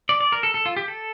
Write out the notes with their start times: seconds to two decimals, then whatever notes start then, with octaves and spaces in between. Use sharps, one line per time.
0.09 D5
0.20 D5
0.32 A#4
0.43 A4
0.54 A4
0.66 F4
0.77 G4
0.88 A4